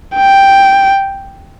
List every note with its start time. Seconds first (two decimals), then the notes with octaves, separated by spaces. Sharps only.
0.16 G5